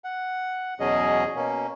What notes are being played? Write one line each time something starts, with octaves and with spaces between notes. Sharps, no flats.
F#5
E2 B2 F#3 C#4 G#4 D#5
B2 A#3 C#4